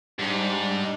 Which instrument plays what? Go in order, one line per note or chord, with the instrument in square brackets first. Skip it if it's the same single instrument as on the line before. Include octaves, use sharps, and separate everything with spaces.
[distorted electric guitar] G#2 [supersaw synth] G3 D4